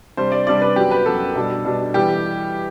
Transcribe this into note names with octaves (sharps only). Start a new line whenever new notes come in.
C3 G3 D4 C5
D5
C3 G3 D4 D5
B4
F#2 F#3 B3 G4
B4
F#2 F#3 B3 A4
B2 G3 D4
B2 G3 D4
E3 G3 B3 G4